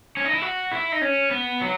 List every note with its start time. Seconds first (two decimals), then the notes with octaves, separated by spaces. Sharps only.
0.17 C#4
0.25 D#4
0.34 E4
0.42 F#4
0.72 E4
0.92 D#4
1.01 C#4
1.31 B3
1.61 F#3